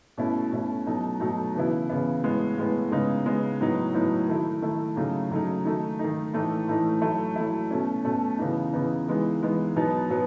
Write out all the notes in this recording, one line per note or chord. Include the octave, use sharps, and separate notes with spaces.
B2 A3 C#4 E4
B2 A3 C#4 E4
B2 F#3 A3 D#4
B2 F#3 A3 D#4
C#3 E3 B3 E4
C#3 E3 B3 E4
A2 G#3 B3
A2 G#3 B3
C#3 G#3 B3 D#4
C#3 G#3 B3 D#4
A2 F#3 B3 D#4
A2 F#3 B3 D#4
D#3 A3 E4
D#3 A3 E4
C#3 F#3 A3 D#4
C#3 F#3 A3 D#4
D#3 A3 D#4
D#3 A3 D#4
A2 E3 A3 D#4
A2 E3 A3 D#4
F#3 A3 E4
F#3 A3 E4
B2 A3 C#4
B2 A3 C#4
C#3 E3 B3 D#4
C#3 E3 B3 D#4
E3 G#3 B3 D#4
E3 G#3 B3 D#4
B2 F#3 B3 D#4
B2 F#3 B3